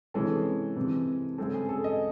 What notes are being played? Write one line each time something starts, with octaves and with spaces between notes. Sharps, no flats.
C3 E3 G#3 C#4 A4
C3 E3 G#3 C4
C#3 G#3 C4 A4
G#4
A4
D#5